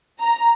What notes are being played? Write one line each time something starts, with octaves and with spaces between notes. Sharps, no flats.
A#5